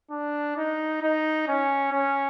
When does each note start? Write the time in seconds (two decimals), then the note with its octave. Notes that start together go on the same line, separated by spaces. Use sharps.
0.11 D4
0.56 D#4
1.02 D#4
1.48 C#4
1.92 C#4